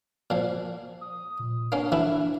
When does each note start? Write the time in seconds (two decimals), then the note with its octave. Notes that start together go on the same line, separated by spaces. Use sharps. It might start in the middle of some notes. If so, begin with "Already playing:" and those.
0.30 A#2 F3
1.01 D#6
1.39 A#2
1.72 A#3 C#4 D4
1.92 E3 A3 E4